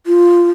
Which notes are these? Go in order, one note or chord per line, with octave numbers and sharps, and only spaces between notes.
F4